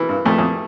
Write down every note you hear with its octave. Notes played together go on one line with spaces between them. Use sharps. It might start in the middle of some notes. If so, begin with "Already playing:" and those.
Already playing: E3
G2
F2 A3
F2